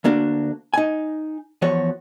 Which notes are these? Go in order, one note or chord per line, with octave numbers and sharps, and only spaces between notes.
D2 A#3 D4 F#4
D#4 G#5
E2 F3 F#4 C#5